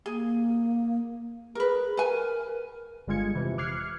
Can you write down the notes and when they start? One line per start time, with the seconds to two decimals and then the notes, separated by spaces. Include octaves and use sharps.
0.06 A#3 G#4
1.55 G#4 A#4 B4
1.97 A#4 B4 G#5
3.07 G1 D3 G#3 F4 G#6 C#7
3.35 F2 C3 E3
3.58 D6 F6 F#6 G#6 C7 C#7